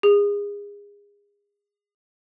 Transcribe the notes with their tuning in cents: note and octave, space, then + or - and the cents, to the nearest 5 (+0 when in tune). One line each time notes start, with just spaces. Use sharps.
G#4 -30